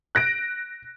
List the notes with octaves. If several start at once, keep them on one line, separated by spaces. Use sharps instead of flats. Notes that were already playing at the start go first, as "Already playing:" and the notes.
F#6 A#6 D7